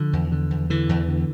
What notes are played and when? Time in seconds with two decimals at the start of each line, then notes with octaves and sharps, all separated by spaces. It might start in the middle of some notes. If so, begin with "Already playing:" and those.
Already playing: D3 F3
0.13 E2
0.32 D3
0.51 E2
0.70 D3 E3
0.89 E2
1.08 D3